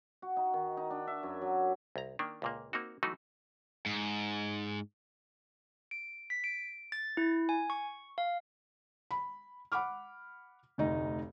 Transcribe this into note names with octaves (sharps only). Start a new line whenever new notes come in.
F#4
D#4
D#3
D#4
D4
E5
F#2
F#3
C2 A#5
D#3 A#3 D4
C#2 A#2 A#3
A#3 C4 D#4 F#4
E3 F#3 A3 D#4 F#4
G#2
D7
B6
D7
A6
E4
G#5
C#6
F5
B5
F#5 B5 D6 F6
F1 D2 D#4 D#5